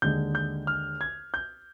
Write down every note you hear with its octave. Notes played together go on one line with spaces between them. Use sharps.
D#2 D3 G#3 G6
G6
F6
G#6
G6